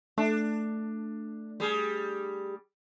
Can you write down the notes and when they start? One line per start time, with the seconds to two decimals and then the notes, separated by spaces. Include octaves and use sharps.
0.18 A3 D4
1.60 G3 G#4